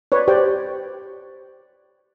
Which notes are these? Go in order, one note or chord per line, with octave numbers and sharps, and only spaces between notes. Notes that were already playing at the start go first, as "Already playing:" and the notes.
B4 C#5 D5
G4 C5 D5 G5